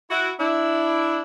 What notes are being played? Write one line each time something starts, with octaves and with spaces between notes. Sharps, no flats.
E4 F#4
D4 E4